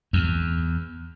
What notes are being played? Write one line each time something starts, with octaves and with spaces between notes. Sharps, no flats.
E2